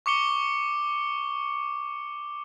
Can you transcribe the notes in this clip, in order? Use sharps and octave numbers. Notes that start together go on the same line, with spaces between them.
C#6 D6 C#7 G7